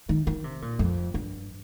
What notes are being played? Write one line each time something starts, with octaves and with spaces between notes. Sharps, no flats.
D#3
D#3
C3
A#2
F2
G2